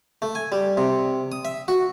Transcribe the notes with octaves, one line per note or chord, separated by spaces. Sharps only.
A3
G#5
G3
C3
D#6
E5
F#4